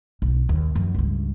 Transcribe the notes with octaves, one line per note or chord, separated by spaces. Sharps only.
B1
D#2
F#2 F3
C#2 G2